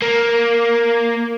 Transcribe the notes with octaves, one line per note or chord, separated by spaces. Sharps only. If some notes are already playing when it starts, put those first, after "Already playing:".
A#3